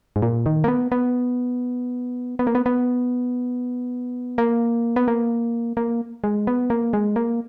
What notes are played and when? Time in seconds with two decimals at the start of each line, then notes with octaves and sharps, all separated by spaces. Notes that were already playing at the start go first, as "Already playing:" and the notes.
0.16 G#2
0.22 A#2
0.46 D#3
0.64 A#3
0.68 B3
0.92 B3
2.39 B3
2.47 A#3
2.55 B3
2.66 B3
4.38 A#3
4.96 B3
5.08 A#3
5.77 A#3
6.24 G#3
6.47 B3
6.70 A#3
6.93 G#3
7.16 A#3